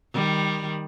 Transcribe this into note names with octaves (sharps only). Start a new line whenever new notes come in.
D#3 G3